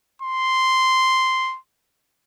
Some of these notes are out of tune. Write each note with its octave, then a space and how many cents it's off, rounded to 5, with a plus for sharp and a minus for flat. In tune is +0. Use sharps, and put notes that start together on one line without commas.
C6 -5